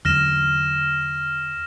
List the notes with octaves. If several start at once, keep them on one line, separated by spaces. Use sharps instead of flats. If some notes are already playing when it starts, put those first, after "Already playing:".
E2 D3 F#3 F6 A#6 E7